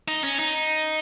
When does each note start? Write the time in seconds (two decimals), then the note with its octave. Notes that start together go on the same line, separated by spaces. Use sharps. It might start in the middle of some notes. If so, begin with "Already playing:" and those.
0.08 D#4
0.24 C#4
0.39 D#4